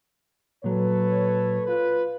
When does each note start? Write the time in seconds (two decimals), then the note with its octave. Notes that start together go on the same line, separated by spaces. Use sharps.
0.64 A#2 F#3 A4 B4 C#5
1.66 F4 B4